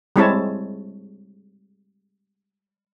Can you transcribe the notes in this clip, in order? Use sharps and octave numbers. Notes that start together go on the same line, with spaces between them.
G3 G#3 C4 E4 C#5 A5